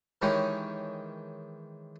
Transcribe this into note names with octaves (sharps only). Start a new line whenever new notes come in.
D#3 E3 G#3 C#4 G4